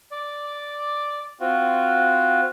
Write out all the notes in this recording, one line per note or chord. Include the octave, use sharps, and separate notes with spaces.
D5
C4 F4 F#4